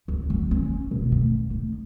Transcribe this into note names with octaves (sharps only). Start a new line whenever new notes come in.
D2
F#3
C#4
B2
D3
D#4